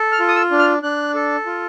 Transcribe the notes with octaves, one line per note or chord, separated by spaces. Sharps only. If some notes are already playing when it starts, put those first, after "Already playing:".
Already playing: A4
F6
F4
D#6
E6
D4
F6
D4 F#6
A4
F4